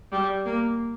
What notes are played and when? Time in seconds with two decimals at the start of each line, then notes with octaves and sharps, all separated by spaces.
0.12 G3
0.45 A#3